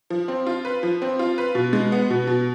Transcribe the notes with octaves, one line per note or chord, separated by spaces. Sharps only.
F3
C4
F4
B4
F3
C4
F4
B4
B2
G#3
B3
B2
B2